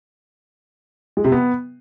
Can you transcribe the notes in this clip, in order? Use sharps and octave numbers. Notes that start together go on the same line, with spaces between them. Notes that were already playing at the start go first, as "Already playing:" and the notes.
G#3
C3
B3